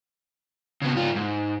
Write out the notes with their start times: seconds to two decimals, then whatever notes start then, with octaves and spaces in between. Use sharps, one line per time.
0.82 C#3 B3
0.95 G#2 F4
1.16 G#2